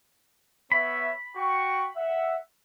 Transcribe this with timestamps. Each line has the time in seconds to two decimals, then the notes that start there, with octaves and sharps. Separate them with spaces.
0.72 B3 C#5 E5 B5
1.36 F#4 G5 C#6
1.97 E5 F#5